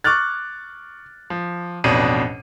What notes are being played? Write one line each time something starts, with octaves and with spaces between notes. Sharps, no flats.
C#6 D6 F6 F#6 A6
F3
A1 F2 B2 D4 D#7